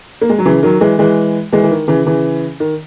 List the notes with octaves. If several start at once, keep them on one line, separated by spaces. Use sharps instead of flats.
A#3
G#3
F#3
C#3 E3
D#3 F#3
E3 G#3
E3 G#3
E3 G#3
E3
D#3
C#3 E3
C#3 E3
D#3